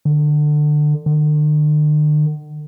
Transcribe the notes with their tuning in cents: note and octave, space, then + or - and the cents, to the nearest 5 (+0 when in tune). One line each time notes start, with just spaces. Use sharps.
D3 +25
D3 +45